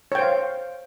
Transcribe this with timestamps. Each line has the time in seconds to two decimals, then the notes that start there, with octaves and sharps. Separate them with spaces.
0.12 C#5
0.15 G5
0.19 C5
0.22 F5